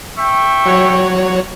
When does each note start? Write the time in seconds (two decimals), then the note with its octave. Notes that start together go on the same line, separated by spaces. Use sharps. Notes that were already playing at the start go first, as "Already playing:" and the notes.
0.18 E5 G5 C#6
0.66 F#3 F#4 C#5